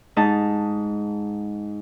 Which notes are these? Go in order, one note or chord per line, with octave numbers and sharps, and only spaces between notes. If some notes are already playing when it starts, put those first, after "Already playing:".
G#2 D#4 A5